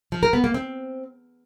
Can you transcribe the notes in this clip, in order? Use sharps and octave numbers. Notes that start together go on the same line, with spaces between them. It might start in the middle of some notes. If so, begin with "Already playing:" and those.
F3
A#4
B3
A#3
C4